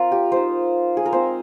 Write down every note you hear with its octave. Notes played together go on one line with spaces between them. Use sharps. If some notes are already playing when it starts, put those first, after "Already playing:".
Already playing: C4 F4 A#4
G4
G#3 D#4 C5
G#4
A#4
G#3 C4 F4 C5